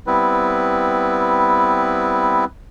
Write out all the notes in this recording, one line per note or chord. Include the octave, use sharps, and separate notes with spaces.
G3 B3 C4 E4 B4